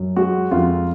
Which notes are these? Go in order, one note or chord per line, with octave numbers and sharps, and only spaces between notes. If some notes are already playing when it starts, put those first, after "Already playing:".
Already playing: F#2
G#3 F#4
F2 F4